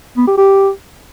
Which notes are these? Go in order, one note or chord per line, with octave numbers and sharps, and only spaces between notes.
B3
G4
G4